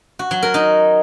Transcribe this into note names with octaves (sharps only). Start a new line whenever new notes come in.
F#4
F#3
A#4
D#4